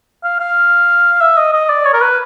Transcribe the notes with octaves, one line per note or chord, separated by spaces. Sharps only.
F5
F5
E5
D#5
D#5
D5
C#5
A#4
B4